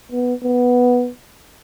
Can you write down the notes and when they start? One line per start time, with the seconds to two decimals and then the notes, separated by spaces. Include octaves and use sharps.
0.12 B3
0.43 B3